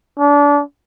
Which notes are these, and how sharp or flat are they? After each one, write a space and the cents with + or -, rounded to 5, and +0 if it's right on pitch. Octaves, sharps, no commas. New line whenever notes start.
D4 -25